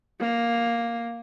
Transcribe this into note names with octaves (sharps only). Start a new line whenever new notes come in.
A#3